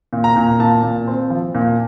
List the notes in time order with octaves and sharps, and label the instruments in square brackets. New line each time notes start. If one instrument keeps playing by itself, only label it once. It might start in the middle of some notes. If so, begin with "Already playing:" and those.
[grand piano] A#2
A#5
A#2
A#2 A5
A#2
C4
F3
A#2